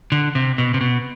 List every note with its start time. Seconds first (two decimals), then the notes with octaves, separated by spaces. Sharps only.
0.12 D3
0.35 C3
0.58 B2
0.74 C3
0.81 B2